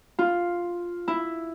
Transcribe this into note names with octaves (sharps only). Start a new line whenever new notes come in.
F4
E4